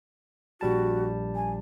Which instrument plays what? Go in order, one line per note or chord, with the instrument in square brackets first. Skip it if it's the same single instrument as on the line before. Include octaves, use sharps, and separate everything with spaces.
[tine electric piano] A#1 G3 A5 [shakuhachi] F#4
[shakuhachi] G#5